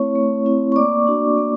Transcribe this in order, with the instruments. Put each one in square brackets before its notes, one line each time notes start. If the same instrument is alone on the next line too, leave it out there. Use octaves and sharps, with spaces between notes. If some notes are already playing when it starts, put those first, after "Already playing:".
Already playing: [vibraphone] A3 C4 E4 C#5 C#6
A3
C4 E4
C#6
A#3 D5 D6
D4 F#4
A#3